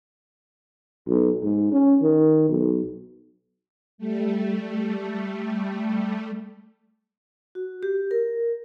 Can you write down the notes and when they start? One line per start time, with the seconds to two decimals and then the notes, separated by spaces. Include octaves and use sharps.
1.07 B1
1.43 G#2
1.72 C#4
2.02 D#3
2.49 B1
3.98 G3 A3
7.55 F#4
7.83 G4
8.11 A#4